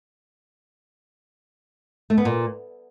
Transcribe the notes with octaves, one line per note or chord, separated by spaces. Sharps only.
A3
B3
A#2